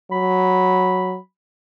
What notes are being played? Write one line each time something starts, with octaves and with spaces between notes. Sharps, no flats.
F#3 B5